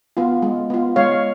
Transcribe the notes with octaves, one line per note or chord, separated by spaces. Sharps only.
B3 F4
G#3
B3 F4
G#3 C#5 F5